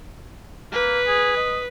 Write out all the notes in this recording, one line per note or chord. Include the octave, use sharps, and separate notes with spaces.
A#3 B4
G#4
D#5